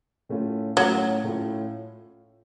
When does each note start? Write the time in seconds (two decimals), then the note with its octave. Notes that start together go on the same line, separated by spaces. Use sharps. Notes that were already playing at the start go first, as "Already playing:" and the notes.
0.29 A2 A3 C#4 F4
0.77 A2 F#3 A3 C#4 F4
1.24 A2 A3 C#4 F4